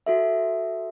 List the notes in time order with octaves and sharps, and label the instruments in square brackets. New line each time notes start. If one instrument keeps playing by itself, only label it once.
[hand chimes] F#4 A4 E5